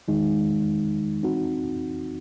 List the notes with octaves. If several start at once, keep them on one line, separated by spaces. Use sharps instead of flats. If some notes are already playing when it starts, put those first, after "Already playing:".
E2 D#3 G#3 D#4
E3 C4 D#4 F#4